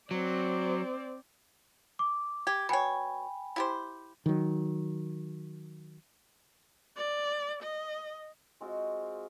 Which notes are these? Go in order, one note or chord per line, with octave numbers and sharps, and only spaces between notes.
F#3 C4 D5
D6
G4 G#6
B2 C#5 G5 G#5 B5
E4 G4 C5
D#3 F#3
D5
D#5
G#3 C4 F4 F#4